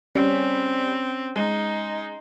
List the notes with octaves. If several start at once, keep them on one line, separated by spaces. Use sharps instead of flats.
G3 C4 C#4
G#3 D#4